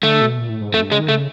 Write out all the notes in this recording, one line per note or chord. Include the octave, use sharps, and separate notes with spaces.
D3 A3
B2
A#2
A2
G#2
F2 A3
G2
C#3 G#3
D#3
C#3 A3